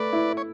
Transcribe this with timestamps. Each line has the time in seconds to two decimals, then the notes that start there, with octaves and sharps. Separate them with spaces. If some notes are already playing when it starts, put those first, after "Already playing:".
Already playing: A3 B4 D5
0.13 E4
0.37 C#5